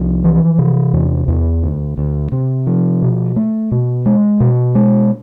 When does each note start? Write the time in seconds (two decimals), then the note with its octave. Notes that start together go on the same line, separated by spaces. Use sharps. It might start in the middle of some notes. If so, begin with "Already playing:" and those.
Already playing: C2 F3
0.24 E3
0.58 C3
0.93 E2
1.28 E2
1.63 D2
1.98 D2
2.32 C3
2.67 F3
3.02 B2
3.36 A3
3.72 B2
4.06 G#3
4.40 B2
4.75 G#3